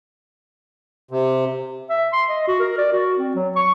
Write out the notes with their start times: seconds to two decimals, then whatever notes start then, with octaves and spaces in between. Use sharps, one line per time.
1.11 C3
1.90 E5
2.13 C6
2.29 D#5
2.48 F#4
2.60 A#4
2.78 D5
2.93 F#4
3.19 C4
3.35 F#3
3.56 C#6